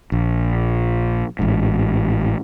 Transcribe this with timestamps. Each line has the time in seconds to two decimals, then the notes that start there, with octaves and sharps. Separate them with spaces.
0.12 A#1
1.39 A1 G#2